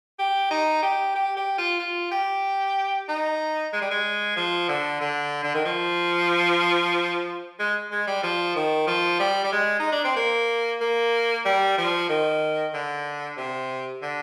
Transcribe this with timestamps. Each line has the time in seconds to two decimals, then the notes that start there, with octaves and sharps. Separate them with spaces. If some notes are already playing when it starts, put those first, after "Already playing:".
0.19 G4
0.51 D#4
0.82 G4
1.16 G4
1.37 G4
1.58 F4
1.79 F4
2.11 G4
3.09 D#4
3.73 G#3
3.82 G3
3.91 G#3
4.36 F3
4.68 D3
5.01 D3
5.43 D3
5.54 D#3
5.65 F3
7.59 G#3
7.91 G#3
8.07 G3
8.23 F3
8.56 D#3
8.87 F3
9.20 G3
9.44 G3
9.52 G#3
9.80 D#4
9.92 D4
10.04 C4
10.16 A#3
10.80 A#3
11.45 G3
11.78 F3
12.09 D#3
12.74 D3
13.37 C3
14.02 D3